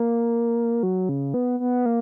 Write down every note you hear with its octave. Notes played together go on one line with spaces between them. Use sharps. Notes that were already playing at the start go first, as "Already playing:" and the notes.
Already playing: A#3
F#3
C#3
B3
B3
A#3